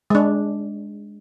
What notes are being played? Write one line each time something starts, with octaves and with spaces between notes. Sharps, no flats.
G#3 D4